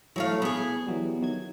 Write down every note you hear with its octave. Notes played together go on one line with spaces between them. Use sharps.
E3 F#3 A3 F5
B3 G#4
E3 F#3 G3
D#3 F#3 G#6